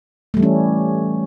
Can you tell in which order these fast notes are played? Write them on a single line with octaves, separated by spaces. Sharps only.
A3 G3 E3 C#4